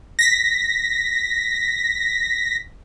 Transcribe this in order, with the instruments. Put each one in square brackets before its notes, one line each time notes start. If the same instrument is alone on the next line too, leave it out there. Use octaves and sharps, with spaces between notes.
[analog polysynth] A#6 B6